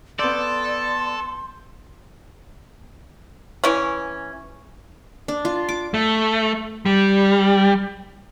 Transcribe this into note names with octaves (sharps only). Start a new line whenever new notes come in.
B3 A4 D5 C6 G6
E3 C#4
D4
F4
D6
A3
G3